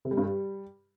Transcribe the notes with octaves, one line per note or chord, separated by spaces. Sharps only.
C3
G3
G2
G3